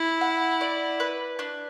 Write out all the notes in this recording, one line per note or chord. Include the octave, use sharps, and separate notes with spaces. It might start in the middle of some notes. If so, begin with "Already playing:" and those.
Already playing: E4
F#5
D5
B4
D4